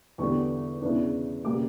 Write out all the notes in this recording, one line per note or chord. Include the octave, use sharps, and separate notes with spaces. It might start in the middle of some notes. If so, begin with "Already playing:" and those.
E2 D3 G3 B3 C#6
E2 C#3 E3 B3 D4
C#3 G3 A#3 D6